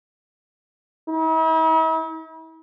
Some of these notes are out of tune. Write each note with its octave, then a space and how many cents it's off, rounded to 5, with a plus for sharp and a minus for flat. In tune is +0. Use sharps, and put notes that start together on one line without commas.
E4 -45